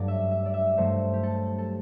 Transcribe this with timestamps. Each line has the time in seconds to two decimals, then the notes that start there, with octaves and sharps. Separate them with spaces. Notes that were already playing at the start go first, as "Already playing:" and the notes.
Already playing: G2 F#3 A3 D5
0.08 E5
0.31 E5
0.46 D5
0.54 E5
0.77 G2 F#3 A3 C5
1.13 G4
1.23 A4
1.58 A4